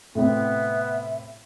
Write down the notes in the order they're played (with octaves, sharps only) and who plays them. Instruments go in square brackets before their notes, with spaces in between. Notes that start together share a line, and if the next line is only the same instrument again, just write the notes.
[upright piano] A2 C3 C4 [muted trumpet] B3 [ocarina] E5